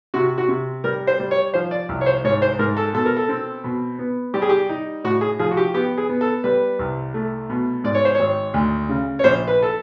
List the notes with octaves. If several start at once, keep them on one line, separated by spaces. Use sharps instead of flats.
C3 F#4
F#4
C3
G3 A#4
C5
G3
C#5
F3 C5
D5
C2
C#5
C5
G#2 C#5
C5
G#2 A#4
A4
B2 A4
A#4
A4
C4
B2
B3
G3 G4
G#4
G4
D#4
A2 F#4
G#4
F3 G#4
F#4
G4
B3 G4
G#4
B3
A4
G3 B4
C2
A3
B2
G#2 D5
C#5
C5
G#1 C#5
D2
C#3
C#5
A#1 C5
B4
A4